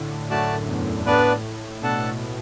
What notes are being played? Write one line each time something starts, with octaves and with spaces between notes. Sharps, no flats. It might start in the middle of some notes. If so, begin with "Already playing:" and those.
Already playing: A2 D3
F#2 A3 F#4 D5 A5
E2
A2 B3 D4 B4 D5
B2 D4 A4 F#5 A5